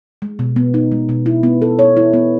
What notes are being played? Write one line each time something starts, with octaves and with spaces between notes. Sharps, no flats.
G#3
B2
B3
D#4
G#3
B2
E4
B3
A4
C#5
E4
B3